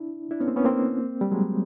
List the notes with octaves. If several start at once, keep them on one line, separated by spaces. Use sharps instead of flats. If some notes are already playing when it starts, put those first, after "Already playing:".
Already playing: D4 E4
D4 E4
B3 C#4
A#3 C4
B3 C#4
A#3 C4
G3
F#3 G#3